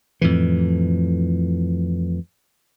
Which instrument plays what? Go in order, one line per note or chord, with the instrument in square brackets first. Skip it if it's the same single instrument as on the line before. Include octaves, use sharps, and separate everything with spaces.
[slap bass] F2 A2 E3